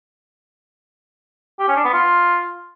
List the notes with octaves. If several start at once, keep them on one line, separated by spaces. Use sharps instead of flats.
G4
C#4
D4
B3
F4